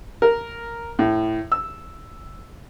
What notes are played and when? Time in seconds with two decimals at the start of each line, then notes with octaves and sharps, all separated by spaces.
0.22 A#4
0.99 A2
1.52 E6